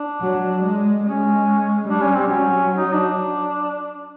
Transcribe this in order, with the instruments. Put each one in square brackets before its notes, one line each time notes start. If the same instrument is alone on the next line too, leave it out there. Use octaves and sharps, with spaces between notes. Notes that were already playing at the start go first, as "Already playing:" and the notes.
Already playing: [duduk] D4
[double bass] F#3
G#3
[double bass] G#3 [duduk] C#4
[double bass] G3 [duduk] D4
[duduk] C#4
C4
[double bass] F#3 [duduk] C#4
[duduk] D#4
D4